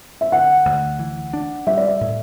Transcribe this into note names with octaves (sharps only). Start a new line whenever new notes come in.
E5
D3 F#5
D2
E3
D4
G3 E5
D5
E5
A2